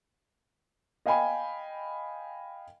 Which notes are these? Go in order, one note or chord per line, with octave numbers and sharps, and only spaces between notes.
D#5 F5 G5 G#5 B5